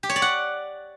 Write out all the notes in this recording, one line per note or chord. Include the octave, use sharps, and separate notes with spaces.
G4
C#5
D5
F#5